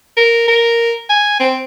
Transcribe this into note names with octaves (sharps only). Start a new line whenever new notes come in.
A#4
A#4
G#5
C4